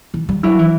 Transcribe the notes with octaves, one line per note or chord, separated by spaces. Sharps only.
E3
G3
F#3 E4
E3